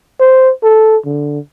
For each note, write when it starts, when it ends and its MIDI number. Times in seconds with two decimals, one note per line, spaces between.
0.20 0.51 72
0.63 0.97 69
1.05 1.39 50